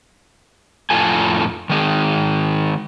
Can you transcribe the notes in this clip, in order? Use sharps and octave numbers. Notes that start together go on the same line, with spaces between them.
F2 A2 F4 A4 G#5
D#3 G#3 G#4